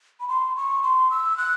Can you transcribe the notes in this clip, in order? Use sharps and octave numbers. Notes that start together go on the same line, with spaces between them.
B5
C6
C#6
C6
E6
F#6